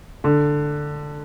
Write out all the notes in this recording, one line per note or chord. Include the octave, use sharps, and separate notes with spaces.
D3